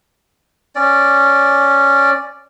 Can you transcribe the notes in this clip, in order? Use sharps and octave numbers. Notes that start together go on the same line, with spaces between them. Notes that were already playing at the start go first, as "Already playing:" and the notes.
C#4 D5